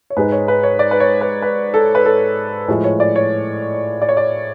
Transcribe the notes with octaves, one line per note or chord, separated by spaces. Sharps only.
C#5
G#2 G#3 B4
C#5
B4
C#5
D5
B4
C#5
B4
B4
A4
B4
A4
A2 F3 G#3
C#5
D5
C#5
D5
C#5
D5